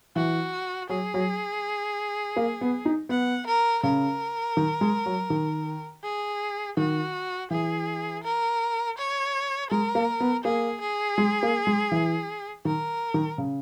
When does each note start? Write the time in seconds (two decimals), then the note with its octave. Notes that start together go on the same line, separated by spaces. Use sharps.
0.16 E3 F#4
0.89 F#3 G#4
1.14 F#3
2.37 A#3
2.61 B3
2.85 D#4
3.09 B3 F#5
3.47 A#4
3.83 C#3 A#4
4.57 D#3
4.81 G#3
5.06 F#3
5.30 D#3
6.04 G#4
6.77 D#3 F#4
7.50 E3 G#4
8.24 A#4
8.98 C#5
9.70 G#3 A#4
9.95 A#3
10.20 B3
10.44 A#3 G#4
10.81 G#4
11.18 G#3
11.43 A#3
11.67 G#3
11.92 E3
12.65 D#3 A#4
13.14 D#3
13.38 C#3